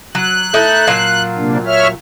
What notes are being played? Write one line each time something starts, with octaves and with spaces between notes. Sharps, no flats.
F#3 F#6
A3 D#4 E4
A#2 F#3 F5
C3 A#3 D4
C#5 E5 F6